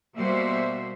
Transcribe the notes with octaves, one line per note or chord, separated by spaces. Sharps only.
B2 G3 A#3 F#4 C5 E5